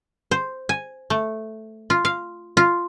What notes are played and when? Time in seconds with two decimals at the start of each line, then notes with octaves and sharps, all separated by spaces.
0.31 C5
0.69 G#5
1.10 A3
1.90 F4
2.05 F5
2.57 F4